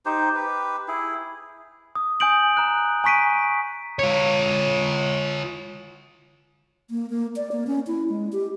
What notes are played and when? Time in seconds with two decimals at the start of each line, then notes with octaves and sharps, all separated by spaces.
0.06 D#4 G4 C5
0.35 G4 B4
0.88 E4 G#4
1.95 D#6
2.20 G#5 D#6 G6 D7 F#7
2.57 A#5 F#6
3.04 G#5 A#5 C#6 B6 D7 D#7
3.99 F4 C#5
6.90 A#3
7.10 A#3
7.36 D5
7.52 A#3
7.67 C#4
7.87 E4
8.10 G#3
8.33 G4